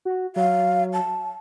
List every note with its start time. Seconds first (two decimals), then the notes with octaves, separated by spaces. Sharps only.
0.05 F#4
0.36 F#3 F5
0.93 A5